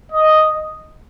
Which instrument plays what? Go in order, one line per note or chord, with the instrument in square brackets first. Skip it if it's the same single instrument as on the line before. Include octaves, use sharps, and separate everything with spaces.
[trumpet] D#5